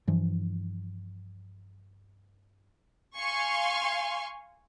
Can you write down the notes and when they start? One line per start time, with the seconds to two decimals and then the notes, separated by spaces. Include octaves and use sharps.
0.07 G2 E3 F3
3.17 F5 G#5 C6 C#6